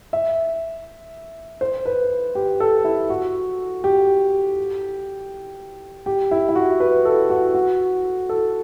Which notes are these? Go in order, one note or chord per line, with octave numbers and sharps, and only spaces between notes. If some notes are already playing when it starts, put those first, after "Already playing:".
E5
C5
B4
G4
A4
E4
F#4
G4
G4
E4
E4
F#4
B4
A4
F#4
F#4
A4